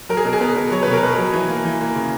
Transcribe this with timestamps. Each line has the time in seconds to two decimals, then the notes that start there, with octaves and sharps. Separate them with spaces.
0.09 F#3 A#4
0.17 G#4
0.25 B2
0.33 G#4
0.40 B3 A#4
0.56 B3
0.71 F#3 C#5
0.83 B2 B4
0.93 A#4
1.03 B2 B4
1.18 F#3
1.33 E3
1.49 A#3
1.65 E3
1.81 A#3
1.95 C#3